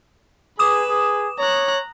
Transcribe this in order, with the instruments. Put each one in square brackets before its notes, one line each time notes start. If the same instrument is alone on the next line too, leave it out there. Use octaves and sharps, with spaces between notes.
[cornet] G#4 [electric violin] B4 [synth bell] D6 D#6 E7
[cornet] G#4
[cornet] C#5 [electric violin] A#5 F#6